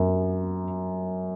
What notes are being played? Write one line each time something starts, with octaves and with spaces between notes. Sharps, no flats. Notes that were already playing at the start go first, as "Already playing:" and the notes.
Already playing: F#2